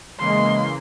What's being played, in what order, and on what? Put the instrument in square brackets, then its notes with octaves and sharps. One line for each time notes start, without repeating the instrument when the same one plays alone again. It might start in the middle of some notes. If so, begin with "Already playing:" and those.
[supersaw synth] C#3 E3 A#3 [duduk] G#3 [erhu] C6